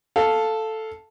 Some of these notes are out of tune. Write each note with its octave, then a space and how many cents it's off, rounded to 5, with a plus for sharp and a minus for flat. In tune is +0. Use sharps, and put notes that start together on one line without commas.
A4 +0 F5 +0